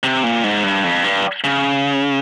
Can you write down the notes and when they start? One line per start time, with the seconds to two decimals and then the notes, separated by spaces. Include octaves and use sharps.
0.03 C3
0.23 A#2
0.44 G#2
0.63 G2
0.84 F2
1.04 G2
1.44 C#3